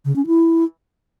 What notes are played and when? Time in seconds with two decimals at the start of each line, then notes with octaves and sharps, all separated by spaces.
0.05 C#3
0.16 C#4
0.27 E4